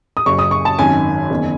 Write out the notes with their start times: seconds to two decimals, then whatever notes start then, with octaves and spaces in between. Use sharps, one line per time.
0.17 D#6
0.26 F#1 F#2 C#3 C#6
0.39 D#6
0.51 C#6
0.65 A5
0.79 G#1 F#2 D#3 G#5
1.30 F#1 E2 D#3